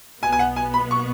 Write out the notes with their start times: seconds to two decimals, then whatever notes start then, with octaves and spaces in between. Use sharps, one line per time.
0.22 B1 B2 B3 G#5
0.32 G#5
0.39 F#5
0.56 G#5
0.74 B5
0.91 C#6